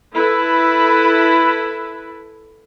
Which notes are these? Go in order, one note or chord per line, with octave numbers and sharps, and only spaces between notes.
E4 A4 B4